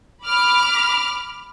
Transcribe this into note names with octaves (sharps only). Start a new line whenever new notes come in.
B5 D6 F6